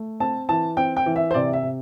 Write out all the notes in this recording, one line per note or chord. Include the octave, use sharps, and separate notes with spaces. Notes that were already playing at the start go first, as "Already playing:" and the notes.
Already playing: A3
C4 A5
E3 A5
C4 G5
G5
E3
E5
C5
C3 D5
E5
C3